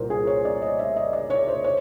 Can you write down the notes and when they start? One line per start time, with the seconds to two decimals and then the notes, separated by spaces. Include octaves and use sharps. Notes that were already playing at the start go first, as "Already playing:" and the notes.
Already playing: C2 A#2 A#4 C5
0.10 G#4
0.27 C#5
0.45 D5
0.62 D#5
0.79 E5
0.96 D#5
1.13 D5
1.30 C#5
1.48 C5
1.64 C#5